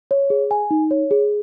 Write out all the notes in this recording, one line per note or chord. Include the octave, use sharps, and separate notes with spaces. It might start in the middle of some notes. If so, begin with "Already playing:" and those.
C#5
G#4
G#5
D#4
C#5
G#4